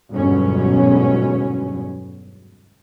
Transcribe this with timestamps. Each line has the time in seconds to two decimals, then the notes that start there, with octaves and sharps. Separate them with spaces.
0.11 G1 E2 G#2 B2 F#3 C#4